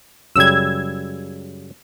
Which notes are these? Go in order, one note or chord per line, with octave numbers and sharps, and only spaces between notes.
F#2 C#3 G3 E6 G#6